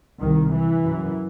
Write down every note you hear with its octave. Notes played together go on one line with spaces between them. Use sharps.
C2 C3 D#3
E3
F#2